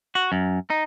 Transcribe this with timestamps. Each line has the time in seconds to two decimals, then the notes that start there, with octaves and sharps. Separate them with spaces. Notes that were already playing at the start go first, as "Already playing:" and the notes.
0.15 F#4
0.32 F#2
0.70 D#4